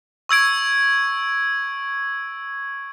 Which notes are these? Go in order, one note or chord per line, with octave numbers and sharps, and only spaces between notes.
C#6 E6 G#6 D7